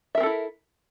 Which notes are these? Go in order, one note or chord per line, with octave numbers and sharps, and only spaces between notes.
C4 E4 A4 A#4 E5